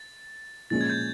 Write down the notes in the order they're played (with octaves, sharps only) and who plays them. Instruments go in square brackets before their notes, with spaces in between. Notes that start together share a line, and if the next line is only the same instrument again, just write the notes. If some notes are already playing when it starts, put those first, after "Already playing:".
Already playing: [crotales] A6
[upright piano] A#2 F3 G#3 C#4 [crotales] A6
[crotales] G#6
G6